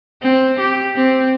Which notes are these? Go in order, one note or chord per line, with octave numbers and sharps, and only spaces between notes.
C4
G4
C4